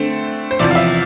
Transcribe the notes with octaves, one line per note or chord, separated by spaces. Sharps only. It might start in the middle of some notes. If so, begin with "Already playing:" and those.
Already playing: D3 A3 C4 C5
C5
E2 C3 F3 D5
F5
E5